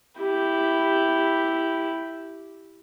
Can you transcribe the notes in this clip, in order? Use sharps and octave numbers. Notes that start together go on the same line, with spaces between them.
E4 G4